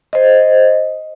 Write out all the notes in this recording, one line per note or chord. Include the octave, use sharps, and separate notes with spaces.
C5 D#5